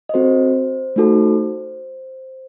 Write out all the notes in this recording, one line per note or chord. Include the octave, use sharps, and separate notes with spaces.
D#5
C4 F#4 A4 C5
A3 D#4 F#4 A4